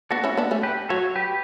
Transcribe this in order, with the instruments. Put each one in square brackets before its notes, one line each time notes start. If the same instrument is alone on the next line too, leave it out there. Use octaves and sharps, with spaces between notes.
[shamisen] B3 D4 [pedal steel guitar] F#4 A4
[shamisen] C#4 E4
B3 D4
A3 C#4
[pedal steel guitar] G4 B4
[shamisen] F#3 [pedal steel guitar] A4 C#5
[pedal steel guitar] G4 B4